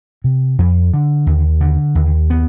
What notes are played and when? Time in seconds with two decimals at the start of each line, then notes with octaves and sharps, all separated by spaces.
0.24 C3
0.59 F2
0.94 D3
1.27 D#2
1.61 D3
1.95 D#2
2.30 B3